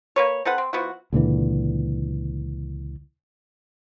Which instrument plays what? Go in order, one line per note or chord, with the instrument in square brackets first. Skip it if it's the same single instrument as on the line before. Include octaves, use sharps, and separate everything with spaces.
[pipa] A#3 B4 C#5
C4 A4 B4 F#5
C4
F3 B3 E4 F#4
[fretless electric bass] C#2 A#2 D3 E3